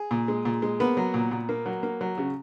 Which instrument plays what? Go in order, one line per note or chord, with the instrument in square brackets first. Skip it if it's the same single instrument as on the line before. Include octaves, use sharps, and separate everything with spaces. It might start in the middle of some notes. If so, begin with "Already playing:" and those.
Already playing: [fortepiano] G#4
A#2
G#3
A#2
G#3
A#3 B3 B4
F#3
A#2
A#2
A#3
F#3
A#3
F#3
C#3